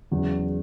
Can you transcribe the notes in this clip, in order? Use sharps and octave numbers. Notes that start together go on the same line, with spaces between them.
E2 C#3 F#3